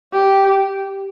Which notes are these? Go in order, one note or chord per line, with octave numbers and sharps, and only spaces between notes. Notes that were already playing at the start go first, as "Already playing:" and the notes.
G4